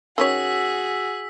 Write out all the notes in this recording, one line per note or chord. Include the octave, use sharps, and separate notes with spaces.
D#3 C#4 F#4 G#4 C#5 E6 B6